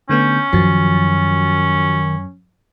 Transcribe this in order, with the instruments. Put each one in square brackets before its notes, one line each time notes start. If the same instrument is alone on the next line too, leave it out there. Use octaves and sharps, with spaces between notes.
[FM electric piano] D3 A3 B3 [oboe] C#4 [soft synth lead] G6
[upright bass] F#2 [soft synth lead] D#3 [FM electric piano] F3 F#4 A6